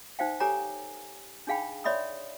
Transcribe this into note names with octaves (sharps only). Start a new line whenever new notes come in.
D#4 C5 F5 G5
G4 A4 C#5 G#5 A#5 D6
D4 D#4 G#4 F5 G5 B5
C#5 D5 E5 B5 C6 D#6